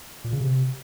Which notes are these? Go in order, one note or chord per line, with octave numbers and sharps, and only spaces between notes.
A#2
C#3
C3